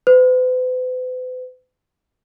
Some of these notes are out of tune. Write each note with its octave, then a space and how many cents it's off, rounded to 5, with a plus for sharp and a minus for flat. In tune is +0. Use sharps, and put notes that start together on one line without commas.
B4 +45